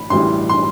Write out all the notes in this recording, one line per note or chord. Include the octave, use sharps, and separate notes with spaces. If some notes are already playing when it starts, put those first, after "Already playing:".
Already playing: A2 E3 B5
A1 A2 E3 G3 C6
C6